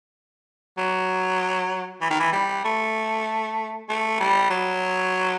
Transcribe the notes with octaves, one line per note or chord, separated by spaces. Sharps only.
F#3
E3
D#3
E3
G3
A3
A3
G3
F#3